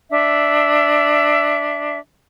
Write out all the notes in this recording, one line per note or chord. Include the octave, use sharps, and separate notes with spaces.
D4 E5